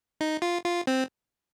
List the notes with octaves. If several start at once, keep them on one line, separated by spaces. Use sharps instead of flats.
D#4
F4
F4
C4